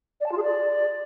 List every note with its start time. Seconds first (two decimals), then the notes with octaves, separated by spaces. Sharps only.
0.20 D5
0.26 A5
0.32 F4
0.37 G#4
0.43 D5